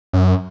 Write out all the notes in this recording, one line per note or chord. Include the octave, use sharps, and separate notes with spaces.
F#2